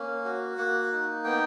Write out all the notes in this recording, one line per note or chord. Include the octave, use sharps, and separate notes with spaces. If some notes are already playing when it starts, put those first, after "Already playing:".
Already playing: A#3 C#4
F#4
A#3 F#5
D#4
B3 G5